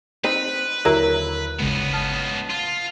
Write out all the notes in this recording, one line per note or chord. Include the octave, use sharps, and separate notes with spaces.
C4 D#4 B4
D#2 D3 F#3 E4 A#4
G1 C#2 C#3 G#3 B3
A5 D#6 F6
F4